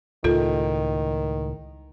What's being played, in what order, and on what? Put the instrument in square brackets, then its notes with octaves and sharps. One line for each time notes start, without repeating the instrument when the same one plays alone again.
[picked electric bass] C#2 A2 [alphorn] D#3 [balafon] F4 A4